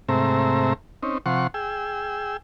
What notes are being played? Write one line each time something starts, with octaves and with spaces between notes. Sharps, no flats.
G#2 C3 A3 C4 E5 A#5
C4 C#4 D#4
C3 F3 F#5 C6 C#6
G#4 G5 E6